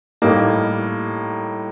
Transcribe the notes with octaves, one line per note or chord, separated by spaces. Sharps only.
A2 G3 A#3 D#4